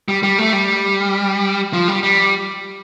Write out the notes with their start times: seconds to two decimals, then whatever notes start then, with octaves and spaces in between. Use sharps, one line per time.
0.08 G3
0.23 G3
0.39 A3
0.53 G3
1.73 F3
1.88 G3
2.03 G3